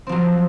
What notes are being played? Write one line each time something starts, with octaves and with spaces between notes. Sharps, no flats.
F3 F#3 C4